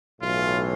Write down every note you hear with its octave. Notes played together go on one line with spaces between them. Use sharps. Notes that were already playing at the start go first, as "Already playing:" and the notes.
B1 A2 E3 F4